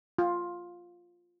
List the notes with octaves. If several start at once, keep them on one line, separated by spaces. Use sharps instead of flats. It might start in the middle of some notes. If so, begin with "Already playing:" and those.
F4